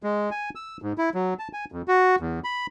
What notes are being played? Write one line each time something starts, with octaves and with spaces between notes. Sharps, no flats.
G#3
G#5
E6
G#2
E4
F#3
A5
G#5
F2
F#4
E2
B5